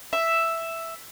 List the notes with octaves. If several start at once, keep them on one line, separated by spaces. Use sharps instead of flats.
E5